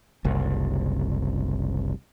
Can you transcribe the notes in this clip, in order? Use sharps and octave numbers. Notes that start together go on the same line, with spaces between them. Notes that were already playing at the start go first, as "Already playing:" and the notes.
F#1 C2